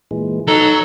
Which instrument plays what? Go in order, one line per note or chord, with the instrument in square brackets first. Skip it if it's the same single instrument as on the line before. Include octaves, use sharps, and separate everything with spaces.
[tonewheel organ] A#2 E3 G#3
[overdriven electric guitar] F#3 A#5 [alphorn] D#4 [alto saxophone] A4 [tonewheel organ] F#6